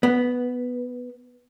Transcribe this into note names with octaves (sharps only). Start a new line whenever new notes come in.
B3